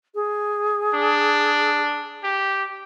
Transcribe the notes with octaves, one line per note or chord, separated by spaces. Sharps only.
G#4
D4
G4